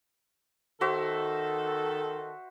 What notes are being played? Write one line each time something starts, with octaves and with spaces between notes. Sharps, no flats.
D#3 F#4 A4 C5 E5